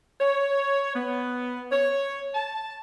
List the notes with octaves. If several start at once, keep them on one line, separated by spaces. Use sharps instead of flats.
C#5
B3
C#5
A5